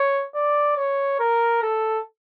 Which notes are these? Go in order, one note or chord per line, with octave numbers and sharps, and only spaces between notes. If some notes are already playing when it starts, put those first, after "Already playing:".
Already playing: C#5
D5
C#5
A#4
A4